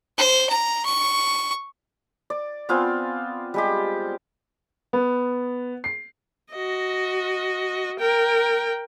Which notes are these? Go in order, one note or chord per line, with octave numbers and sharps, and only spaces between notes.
C5
A#5
C#6
D5
B3 C4 F4 G#5
G3 G#3 G4
B3
C7
F#4 D#5
A#4 G5